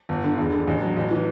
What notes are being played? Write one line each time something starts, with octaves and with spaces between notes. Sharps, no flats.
G1
D3
E1
D3
A1
F#3
A1
E3